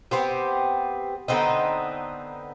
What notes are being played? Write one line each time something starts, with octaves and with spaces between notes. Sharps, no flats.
B3 C4 G4
D3 B3 C4 D#4